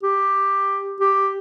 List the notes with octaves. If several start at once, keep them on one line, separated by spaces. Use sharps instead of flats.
G4
G4